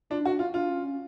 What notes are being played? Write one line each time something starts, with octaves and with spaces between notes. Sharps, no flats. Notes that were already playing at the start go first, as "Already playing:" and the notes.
D4 F4
D4
F#4
D4
F4
F#4
D4 F4
C#4
C#4